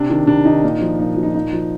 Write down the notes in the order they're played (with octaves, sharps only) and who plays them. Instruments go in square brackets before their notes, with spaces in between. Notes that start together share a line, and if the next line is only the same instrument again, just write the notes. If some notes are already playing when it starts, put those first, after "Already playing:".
Already playing: [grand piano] C3 D4
D#3
C3 D4
D#3 D#4
A#2
F3
A#2 D#4
F3
D#4
A#2 D#4
F3